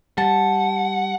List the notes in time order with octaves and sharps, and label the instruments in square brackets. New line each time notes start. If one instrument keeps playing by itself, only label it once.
[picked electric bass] G3 [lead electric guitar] F#5 [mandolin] A5